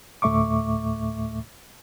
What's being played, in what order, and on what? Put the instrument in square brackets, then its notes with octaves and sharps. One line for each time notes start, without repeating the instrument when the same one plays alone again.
[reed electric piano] D2 A2 A3 E5 C#6 D6